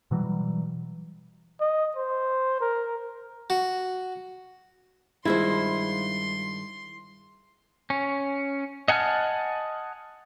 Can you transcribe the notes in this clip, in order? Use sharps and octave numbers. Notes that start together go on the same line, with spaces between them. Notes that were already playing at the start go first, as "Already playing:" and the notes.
B2 E3 F#3 G3
D#5
C5
A#4
F#4
G2 D#3 G#3 E4 F4 G#4 C5 C6
C#4
D#5 F#5 G#5 A5 F6